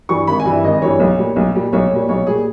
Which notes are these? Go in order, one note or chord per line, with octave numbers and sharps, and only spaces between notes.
G2 E3 G3 C#6
G#1 B5
G#5
G2 E3 G3
E5
G#1 D#5
G2 E3 G3 C#5
B1
A#2 G3
B1
A#2 G3
B1 C#5
A#2 G3
B1 C#5
A#2 G3 G#4